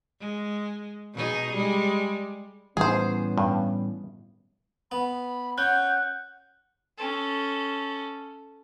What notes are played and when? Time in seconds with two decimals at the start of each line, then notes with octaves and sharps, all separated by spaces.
0.20 G#3
1.14 B2 D#4 G#4
1.53 G3 G#3
2.77 A2 E3 G3 B3 C#4 G#4 C5
3.38 G2
4.92 B3 B5
5.58 C#4 F#5 F#6 G6
6.98 C#4 A4